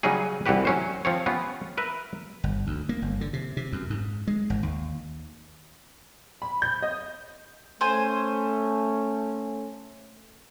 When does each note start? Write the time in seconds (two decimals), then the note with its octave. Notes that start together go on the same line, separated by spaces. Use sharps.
0.03 C#3 F#3 G3 C#4 D#4 G#4
0.46 C2 E3 F#4 G4 B4
0.65 F#3 C#4 C5
1.05 F3 C4 C#5
1.26 B3 C#4 F4 G4
1.77 A#4 B4 E5
2.44 G1
2.67 D2
2.89 A#3
3.02 G1
3.21 D3
3.33 C3
3.57 C3
3.73 F#2
3.90 G#2
4.27 G#3
4.50 G#1
4.63 D#2
6.42 B5
6.62 G6
6.82 D#5
7.81 A3 C#4 C5 G#5